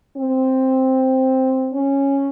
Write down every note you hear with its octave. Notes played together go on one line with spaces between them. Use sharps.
C4
C#4